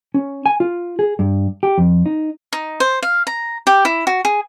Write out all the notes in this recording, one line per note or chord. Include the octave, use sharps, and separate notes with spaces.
C#4
G#5
F4
G#4
G2
G4
F2
D#4
D#4
C5
F5
A#5
G4
E4
F#4
G#4